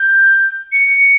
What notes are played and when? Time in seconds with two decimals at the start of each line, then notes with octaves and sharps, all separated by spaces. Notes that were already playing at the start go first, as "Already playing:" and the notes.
Already playing: G6
0.72 C#7